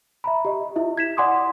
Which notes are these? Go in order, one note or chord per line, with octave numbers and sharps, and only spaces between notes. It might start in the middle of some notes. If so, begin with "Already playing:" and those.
E5 A#5 B5
G4 D#5
E4 F4 E5
G#6 B6 E7
D5 F#5 G#5 C6 D6 D#6